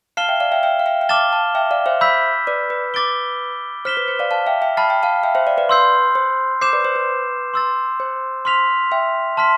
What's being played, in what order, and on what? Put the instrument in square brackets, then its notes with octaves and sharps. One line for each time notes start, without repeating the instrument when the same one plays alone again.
[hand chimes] F5 A5 [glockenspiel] F6 C7 E7 G7
[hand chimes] E5 G5
D5 F5
E5 G5
E5 G5
F5
E5 G5
G5
[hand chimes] F5 A5 [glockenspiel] D6 F6 A6 E7 G7
[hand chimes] F5 A5
E5 G5
D5 F5
C5 E5
[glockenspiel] B5 E6 G6 B6
[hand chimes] B4 D5
B4
[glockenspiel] D6 A6 D7 G7
[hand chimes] C5 [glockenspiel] F6 B6 E7 G7
[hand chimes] B4
C5
D5 F5
F5 A5
E5 G5
E5 G5
[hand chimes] A5 [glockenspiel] B5 F6 A6 C7
[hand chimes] G5
F5 A5
E5 G5
C5 E5
D5 F5
B4 D5
[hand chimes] B4 [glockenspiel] C6 E6 G6 C7
[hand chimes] C5
[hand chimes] C5 [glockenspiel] D6 G6 C7 E7
[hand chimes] B4 D5
C5
B4
[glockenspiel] C6 E6 A6
[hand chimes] C5
[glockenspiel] C6 F6 B6 F7
[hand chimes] E5 G5
[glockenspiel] A5 C6 F6 B6